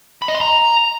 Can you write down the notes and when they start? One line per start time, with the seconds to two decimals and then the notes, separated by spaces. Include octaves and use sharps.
0.22 B5
0.28 D#5
0.35 C6
0.41 A#5